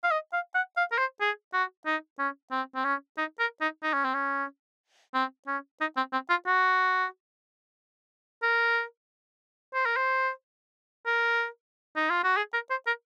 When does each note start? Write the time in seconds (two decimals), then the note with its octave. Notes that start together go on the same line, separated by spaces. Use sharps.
0.04 F5
0.11 D#5
0.33 F5
0.55 F#5
0.77 F5
0.92 A#4
0.98 C5
1.21 G#4
1.53 F#4
1.86 D#4
2.19 C#4
2.52 C4
2.75 C4
2.84 C#4
3.18 D#4
3.39 A#4
3.61 D#4
3.83 D#4
3.93 C#4
4.04 C4
4.14 C#4
5.14 C4
5.47 C#4
5.81 D#4
5.97 C4
6.13 C4
6.30 F4
6.46 F#4
8.43 A#4
9.74 C5
9.86 A#4
9.97 C5
11.06 A#4
11.96 D#4
12.10 F4
12.24 F#4
12.37 G#4
12.54 A#4
12.70 C5
12.87 A#4